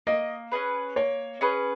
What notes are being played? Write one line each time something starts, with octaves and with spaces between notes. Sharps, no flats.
A#3 D#5
C#4 G#4 B4
A#3 C#5
C#4 G#4 B4